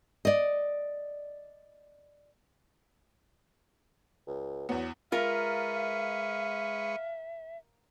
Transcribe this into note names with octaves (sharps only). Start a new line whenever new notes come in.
D5 D#5
C#2
E2 F#3 B3
G#3 F4 A#4 B4 E5 F5 C#6